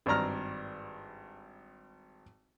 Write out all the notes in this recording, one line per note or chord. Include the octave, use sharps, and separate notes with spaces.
G#1 G2 D5 A#5 F6